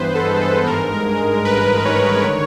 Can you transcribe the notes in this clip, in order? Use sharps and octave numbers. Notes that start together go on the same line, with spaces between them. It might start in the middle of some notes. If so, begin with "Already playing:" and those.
Already playing: G2 E3 B3 B4 C5
A4
G#3
A4
G#2 A#4
G#3
A1 B4
D#3 C#5
D3